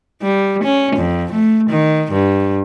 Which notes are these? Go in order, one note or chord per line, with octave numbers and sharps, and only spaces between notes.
G3
C#4
F2
A3
D#3
G2